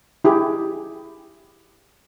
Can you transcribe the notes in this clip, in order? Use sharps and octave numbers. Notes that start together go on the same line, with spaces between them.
E4 G4 G#4